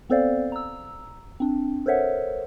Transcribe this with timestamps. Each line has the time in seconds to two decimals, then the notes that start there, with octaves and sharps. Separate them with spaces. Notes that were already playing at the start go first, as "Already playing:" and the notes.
0.10 B3 C4 A4 C5 D5 F5
0.52 A#5 E6
1.40 C4 D4
1.86 A4 A#4 C5 C#5 E5 F#5